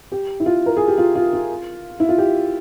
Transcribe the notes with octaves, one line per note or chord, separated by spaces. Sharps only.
G4
E4
F4
A#4
G#4
G4
F4
F4
F4
E4
F4
G4